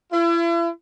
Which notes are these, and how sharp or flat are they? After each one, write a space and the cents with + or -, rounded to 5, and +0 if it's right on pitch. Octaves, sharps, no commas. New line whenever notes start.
E4 +40